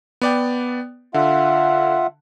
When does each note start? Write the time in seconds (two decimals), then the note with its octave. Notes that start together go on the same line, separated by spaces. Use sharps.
0.21 B3 D5 G5
1.14 D3 F4 E5 F#5